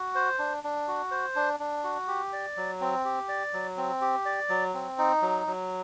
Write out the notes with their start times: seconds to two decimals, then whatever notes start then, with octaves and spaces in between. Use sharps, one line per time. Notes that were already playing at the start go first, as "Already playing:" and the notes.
Already playing: F#4
0.15 C5
0.39 D4
0.64 D4
0.88 F#4
1.11 C5
1.36 D4
1.60 D4
1.84 F#4
2.08 G4
2.33 D5
2.57 F#3
2.81 C4
3.05 G4
3.29 D5
3.53 F#3
3.77 C4
4.01 G4
4.26 D5
4.49 F#3
4.74 C4
4.98 D#4
5.22 F#3
5.47 F#3